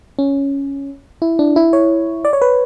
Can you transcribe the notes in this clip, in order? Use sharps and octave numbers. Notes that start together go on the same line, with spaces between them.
C#4
E4
D4
E4
C#5
D5
C#5
B4